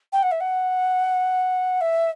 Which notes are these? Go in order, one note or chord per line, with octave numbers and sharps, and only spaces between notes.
G5
F#5
E5
F#5
E5